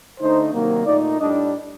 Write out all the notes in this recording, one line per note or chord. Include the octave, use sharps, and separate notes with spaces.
D3 A3 D#4 C5
C3 D#3 F#3 A#3
A#2 A3 D#4 D5
A2 G3 D4 D#5